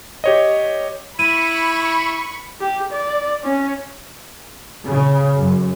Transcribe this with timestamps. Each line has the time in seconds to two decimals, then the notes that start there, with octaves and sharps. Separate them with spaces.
0.24 G4 C#5 D#5
1.19 E4 B5 C#6 D#7
2.61 G4
2.92 D5
3.44 C#4
4.87 C#3
5.35 F#2